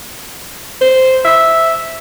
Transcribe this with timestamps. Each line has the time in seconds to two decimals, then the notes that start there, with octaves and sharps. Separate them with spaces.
0.81 C5
1.25 E5